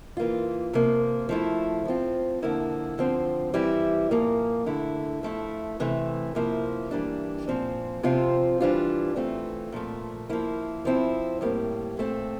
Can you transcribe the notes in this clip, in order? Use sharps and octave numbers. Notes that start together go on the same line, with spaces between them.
E3 A#3 F4
C3 F3 A#3
F3 A3 E4
F3 C4 F4
D3 F3 A#3 E4
D3 F3 C4
E3 G3 C4 E4
A#2 F3 A#3
D3 A3 E4
F3 A3 E4
C3 E3 A3
C3 F3 A#3 E4
E3 G3 A#3 D4
A#2 F3 C4
C3 F3 C4 F4
E3 G3 D4 F4
E3 A3 C4 F4
A#2 F3 A3
F3 A#3 E4
F3 C4 E4
A2 G3 A#3
A#2 A3 C4